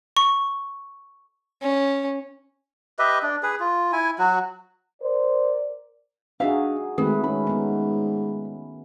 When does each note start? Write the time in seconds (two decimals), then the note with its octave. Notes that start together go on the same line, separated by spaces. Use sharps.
0.17 C#6
1.62 C#4
2.99 G4 B4 D#5 E5
3.23 D4
3.43 G#4 B4
3.60 F4
3.92 E4 G#5
4.19 F#3 F#4
5.02 A#4 C5 D5
6.40 D4 D#4 F#4 G#4 E5 F5
6.98 G#1 D#3 A3 G#4 B4
7.24 G#2 C#4 B5
7.47 B3 D#4